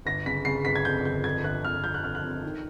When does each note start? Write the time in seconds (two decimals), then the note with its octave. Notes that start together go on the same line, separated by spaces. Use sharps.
0.05 G1 A#6
0.26 C#3 B6
0.45 C#3 C7
0.65 G1 B6
0.76 G#6
0.85 F2 G6
1.05 G1 G6
1.24 F2 G#6
1.44 G1 F#6
1.64 G1 F6
1.84 F2 G6
1.94 F#6
2.04 G1 F6
2.15 F#6
2.23 F2
2.43 D#3